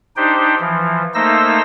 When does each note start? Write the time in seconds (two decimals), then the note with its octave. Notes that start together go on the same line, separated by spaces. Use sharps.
0.17 D4 D#4 G4 C5 G5
0.60 E3 F3
1.14 A3 A#3 D#4 C5 E6 A#6